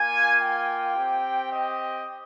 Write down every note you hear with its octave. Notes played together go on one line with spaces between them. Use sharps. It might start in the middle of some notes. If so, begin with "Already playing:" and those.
Already playing: A#3 F4 G#5
G5
C4 G4
D#5